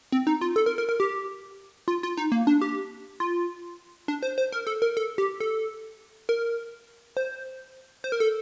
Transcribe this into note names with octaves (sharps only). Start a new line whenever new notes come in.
C4
D#4
F4
A4
A#4
A#4
A#4
G4
F4
F4
D#4
A#3
D4
G4
F4
D4
C5
C5
A#4
A4
A#4
A4
G4
A4
A#4
C5
C5
A#4
A4